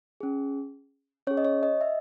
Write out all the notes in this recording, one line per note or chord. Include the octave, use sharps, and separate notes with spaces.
C#4 G#4
C#4 G#4 C#5
D#5
C#5
D#5
E5